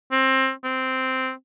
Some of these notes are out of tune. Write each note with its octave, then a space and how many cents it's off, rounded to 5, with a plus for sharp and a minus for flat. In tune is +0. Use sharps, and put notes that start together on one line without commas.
C4 +20
C4 -5